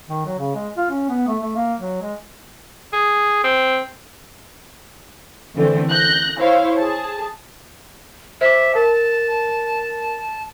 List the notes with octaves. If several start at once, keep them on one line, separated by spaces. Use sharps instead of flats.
D#3
F#3
C#3
G#3
F4
C#4
B3
A3
A3
A#3
F#3
G#3
G#4
C4
D3 E3 A3 C4
F#6 G6 A#6
E4 C5 C#5 F5
G#4 A5
C5 E5 D6
A#4 A5